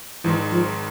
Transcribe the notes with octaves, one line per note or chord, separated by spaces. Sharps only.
G#1 G#2 E3 G#3
F3